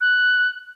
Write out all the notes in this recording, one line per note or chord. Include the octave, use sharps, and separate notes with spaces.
F#6